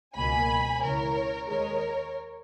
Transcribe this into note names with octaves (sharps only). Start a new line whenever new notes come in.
C#2 B2 F#3 A#3 G#5 B5
C#2 C#3 E3 A#4 C#5
D#2 D#3 G#3 A#4 C#5